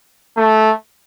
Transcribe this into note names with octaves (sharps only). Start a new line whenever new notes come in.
A3